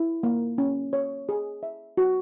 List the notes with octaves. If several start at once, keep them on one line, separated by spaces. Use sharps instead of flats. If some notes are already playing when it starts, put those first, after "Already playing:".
Already playing: E4
A#3
C#4
C#5
G#4
E5
F#4